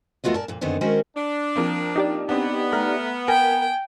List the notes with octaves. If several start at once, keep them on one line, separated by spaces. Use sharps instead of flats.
D#2 A3 B3 F4 F#4 D#5
A#2 A#4 D5 A5
F2 A#2
F#2 D3 D#3 B3 C4 D4
D#3 G#3 C#4 F#4 A#4 C5
D4
F3 A#3 C4
D#4 G4 D5
B3 C4 D4
A3 A#5 F6
A#4 G5 G#5